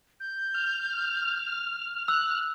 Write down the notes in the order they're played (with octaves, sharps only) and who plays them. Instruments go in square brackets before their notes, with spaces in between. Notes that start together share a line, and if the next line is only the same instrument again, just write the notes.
[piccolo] G6
[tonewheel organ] F6
[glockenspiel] E6 [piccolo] F#6